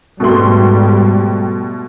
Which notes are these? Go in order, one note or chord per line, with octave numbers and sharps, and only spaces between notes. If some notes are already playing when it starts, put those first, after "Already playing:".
G#2 B2 G3 A3 C6